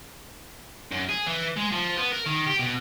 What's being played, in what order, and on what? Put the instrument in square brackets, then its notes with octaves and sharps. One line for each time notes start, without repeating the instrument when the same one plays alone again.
[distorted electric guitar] F#2
G#4
E3
G#3
F3
B3
A#4
D#3
G4
B2